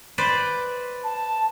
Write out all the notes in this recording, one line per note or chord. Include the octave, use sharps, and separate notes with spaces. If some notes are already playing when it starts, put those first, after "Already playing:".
B4 C5 D5
A5